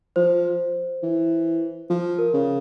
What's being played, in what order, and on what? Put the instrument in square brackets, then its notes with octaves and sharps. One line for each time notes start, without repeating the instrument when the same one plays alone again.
[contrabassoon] F3 [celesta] C5
[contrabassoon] E3
F3
[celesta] A#4
[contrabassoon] C#3